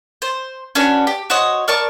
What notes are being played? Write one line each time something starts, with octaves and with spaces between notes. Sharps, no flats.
C5
C#4 D4 F#4 B4
G4
F#4 C5 C#5 D#5
A#4 D5 A5 C#6